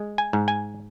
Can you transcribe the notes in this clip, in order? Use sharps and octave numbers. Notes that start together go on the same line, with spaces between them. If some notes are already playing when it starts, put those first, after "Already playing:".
Already playing: G#3
G#5
G#2
G#5